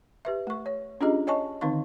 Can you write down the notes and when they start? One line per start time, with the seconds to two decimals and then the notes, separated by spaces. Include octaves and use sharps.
0.25 G4 B4 E5
0.47 A3 C#6
0.66 C#5
1.01 C#4 D4 F4 G4 G#4 D#5
1.27 C#5 D#5 G#5 A5 C#6
1.61 D3 D#3 C4 D#4 F5 C#6